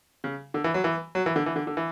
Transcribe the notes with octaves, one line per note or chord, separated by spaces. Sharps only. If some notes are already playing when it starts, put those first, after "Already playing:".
C#3
D3
E3
F#3
E3
F#3
E3
D3
E3
D3
D3
E3